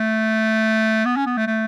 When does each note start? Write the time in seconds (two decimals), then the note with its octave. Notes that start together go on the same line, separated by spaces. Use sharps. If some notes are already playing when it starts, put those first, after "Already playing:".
Already playing: A3
1.05 B3
1.16 C#4
1.26 B3
1.37 A3
1.47 A3